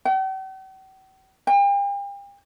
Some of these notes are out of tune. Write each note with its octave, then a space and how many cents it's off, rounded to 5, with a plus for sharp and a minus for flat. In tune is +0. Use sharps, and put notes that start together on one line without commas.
G5 -45
G5 +40